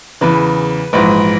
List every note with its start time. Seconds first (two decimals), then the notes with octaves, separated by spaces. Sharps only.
0.21 E2 C#3 E3 B4
0.93 A#1 G#2 E3 B4